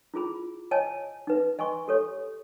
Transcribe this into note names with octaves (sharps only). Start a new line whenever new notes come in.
E4 F4 G#4 B5
C#5 D#5 G#5 A5
D#4 B4 E5
D#5 G#5 C6 C#6
G4 A4 C#5